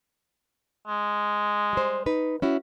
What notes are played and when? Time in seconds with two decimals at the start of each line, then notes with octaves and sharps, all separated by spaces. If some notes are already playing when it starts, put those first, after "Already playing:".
0.88 G#3
1.73 G3 C5
2.06 D#4 B4
2.42 C#4 E4 F#4